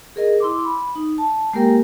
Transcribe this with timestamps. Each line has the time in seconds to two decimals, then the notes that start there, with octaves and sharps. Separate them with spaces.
0.16 G#4 A#4 D#5
0.40 E4 C6 D6
0.65 B5
0.95 D#4
1.18 A5
1.53 G#3 A#3 G4 A#4 G5